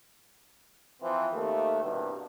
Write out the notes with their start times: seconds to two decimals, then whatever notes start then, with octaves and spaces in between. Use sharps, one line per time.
1.02 E3 F3 C4
1.33 D#2 A3
1.83 C2 G2 B2